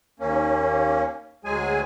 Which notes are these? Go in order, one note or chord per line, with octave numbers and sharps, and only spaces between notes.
D#2 A#3 C#4
D2 F#3 G#3 G#4 G#5